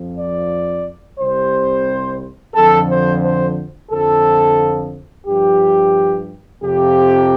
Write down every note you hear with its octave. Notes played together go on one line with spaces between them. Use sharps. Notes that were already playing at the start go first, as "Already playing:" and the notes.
Already playing: F2 F3
D5
C2 C3 G3 C5
F2 D3 F3 A4
C5
C5
F2 D3 F3 A4
G2 F3 G4
F2 C3 F3 G4